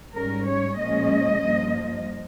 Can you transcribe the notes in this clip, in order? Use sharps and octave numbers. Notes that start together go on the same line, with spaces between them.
G#2 G3 C#4 A#4
C#5
A#2 F3 G#3 C#4 D#5
G2 F3 A#3